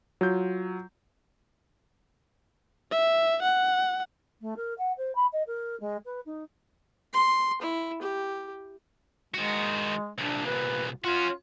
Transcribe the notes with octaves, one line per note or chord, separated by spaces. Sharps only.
F#3 F4 G6
E5
F#5
A3
A#4
F#5
C5
B5
D#5
A#4
G#3
B4
D#4
C6
E4
G4
D#3 G#3 F#4
C2 A#2 D4
B4
C#4 F4 F#4